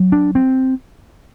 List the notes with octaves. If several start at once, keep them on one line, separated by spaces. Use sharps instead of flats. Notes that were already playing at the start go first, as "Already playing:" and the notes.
Already playing: F#3
D4
C4